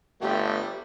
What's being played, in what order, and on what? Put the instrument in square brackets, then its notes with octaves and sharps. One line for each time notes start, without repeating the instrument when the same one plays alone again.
[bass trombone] G1 [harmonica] G3 B3 G5 [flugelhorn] A3 [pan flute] G4